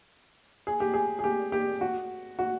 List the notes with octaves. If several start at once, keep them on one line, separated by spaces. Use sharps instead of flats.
G#4
G4
G#4
G#4
G4
G4
F#4
F#4